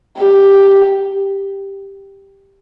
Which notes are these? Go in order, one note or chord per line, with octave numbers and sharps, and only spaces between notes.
G4